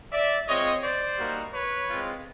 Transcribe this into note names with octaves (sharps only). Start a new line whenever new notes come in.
D5 E5
G#3 C4 F4 C#5 D#5
C5 D5
G3 A#3 D#4 F#4
B4 C#5
G#3 C4 F4